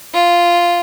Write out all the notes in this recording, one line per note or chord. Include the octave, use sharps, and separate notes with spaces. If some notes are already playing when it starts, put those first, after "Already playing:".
F4